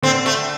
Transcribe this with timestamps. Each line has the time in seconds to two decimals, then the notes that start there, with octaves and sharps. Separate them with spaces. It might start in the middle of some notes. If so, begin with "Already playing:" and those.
0.03 D3 C4
0.26 A3